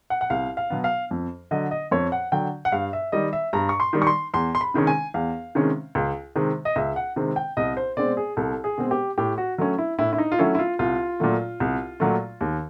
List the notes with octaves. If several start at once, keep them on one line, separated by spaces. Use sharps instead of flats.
F#5
F#5
C2 F5
F5
B2 F#3 B3
F5
F2
D3 F#3 D#5
D#5
F2 C#5
F#5
D3 F#3 G5
F#5
G2 F5
E5
D#3 G3 D#5
E5
G2 A#5
C#6
C6
D#3 G3
C#6
C6
E2 C6
C6
B5
C3 D#3 G#3 C#4
G#5
E2 F5
C3 D#3 G#3 C#4
C#2
C3 D#3 G#3 C4
D#5
C#2 E5
F#5
C3 D#3 G#3 C4
G5
C2 D#5
C5
B2 G#3 C4 D5
G#4
C2 A4
G#4
B2 G#3 C4
G4
A2 G4
F#4
F#3 A3 C#4
E4
A2 E4
E4
D#4
F4
F#3 A3 C#4 E4
E4
F4
C2 F4
A#2 F#3 A3
C2
A#2 F#3 A3
D#2